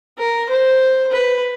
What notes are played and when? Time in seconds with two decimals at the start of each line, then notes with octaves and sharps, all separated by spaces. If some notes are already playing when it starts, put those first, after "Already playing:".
0.18 A#4
0.49 C5
1.12 B4